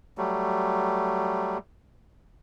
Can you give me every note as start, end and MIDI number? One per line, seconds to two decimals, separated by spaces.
0.18 1.58 54
0.18 1.58 55
0.18 1.58 57